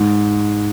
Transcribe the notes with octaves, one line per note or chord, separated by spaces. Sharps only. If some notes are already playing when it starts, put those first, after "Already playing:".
Already playing: G#2